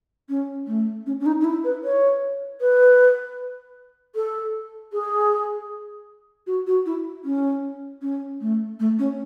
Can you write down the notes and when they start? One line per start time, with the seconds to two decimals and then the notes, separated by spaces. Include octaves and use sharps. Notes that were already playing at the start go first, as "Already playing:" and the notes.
0.29 C#4
0.67 A3
1.06 C#4
1.20 C#4
1.26 D#4
1.41 D#4
1.44 E4
1.64 B4
1.84 C#5
2.61 B4
4.15 A4
4.93 G#4
6.47 F#4
6.67 F#4
6.86 E4
7.25 C#4
8.02 C#4
8.41 A3
8.80 A3
8.99 C#4